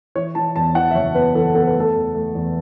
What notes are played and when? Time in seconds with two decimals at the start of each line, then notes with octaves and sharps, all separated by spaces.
0.15 E3 C#5
0.35 E3 A5
0.56 E2 A5
0.75 E3 F#5
0.91 E5
0.95 F#1 C#5
1.14 B3 B4
1.35 E3 A4
1.55 B3 A4
1.67 B4
1.75 A3
1.80 A4
1.95 E2
2.15 A3
2.35 E2